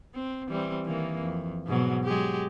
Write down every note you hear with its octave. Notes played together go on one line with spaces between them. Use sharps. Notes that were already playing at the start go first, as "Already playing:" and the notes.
C4
E3 G3 C4
D#3 E3 A#3
F2
G#2 B2 F#3
F#3 G#3 G4